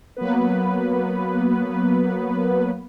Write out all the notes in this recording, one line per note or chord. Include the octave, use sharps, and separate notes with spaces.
F#3 A#3 B3 B4